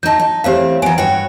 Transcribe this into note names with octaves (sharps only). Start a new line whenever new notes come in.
F#3 D#4 A5 G6
D#4
E3 A3 C4 G4 C#5 F5
F#3 B3 G#5 D7
G2 F#4 C#5 G5